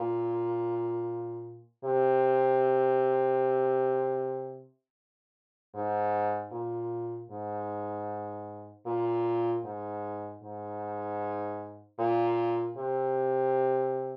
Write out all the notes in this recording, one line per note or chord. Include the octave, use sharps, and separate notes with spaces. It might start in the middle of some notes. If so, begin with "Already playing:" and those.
Already playing: A#2
C3
G#2
A#2
G#2
A#2
G#2
G#2
A#2
C3